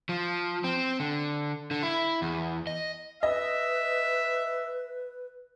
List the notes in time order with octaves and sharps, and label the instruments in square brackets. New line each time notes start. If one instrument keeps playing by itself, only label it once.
[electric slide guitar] F3
C4
D3
D3
E4
E2
D#5
[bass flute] B4 [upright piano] D#5 [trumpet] E5